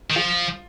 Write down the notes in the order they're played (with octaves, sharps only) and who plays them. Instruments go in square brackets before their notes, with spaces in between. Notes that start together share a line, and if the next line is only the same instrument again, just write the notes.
[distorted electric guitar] D#3
[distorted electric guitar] F3 [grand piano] F4